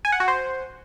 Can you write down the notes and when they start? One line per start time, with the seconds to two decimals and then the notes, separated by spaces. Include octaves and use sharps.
0.05 G#5
0.12 F#5
0.20 F#4
0.28 C5